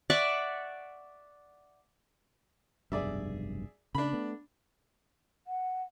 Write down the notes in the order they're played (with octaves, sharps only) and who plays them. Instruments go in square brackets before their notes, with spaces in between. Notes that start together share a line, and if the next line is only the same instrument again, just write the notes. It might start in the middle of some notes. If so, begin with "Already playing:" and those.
[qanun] D5 E5 F#5 C#6
[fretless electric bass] F1 B1 G2 [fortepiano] G#4 D5 E5
[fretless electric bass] C#3 [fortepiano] D4 B5
[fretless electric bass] A3 B3
[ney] F#5